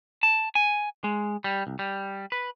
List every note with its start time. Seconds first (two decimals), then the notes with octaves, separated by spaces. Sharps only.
0.23 A5
0.55 G#5
1.04 G#3
1.44 G3
1.67 C2
1.79 G3
2.32 B4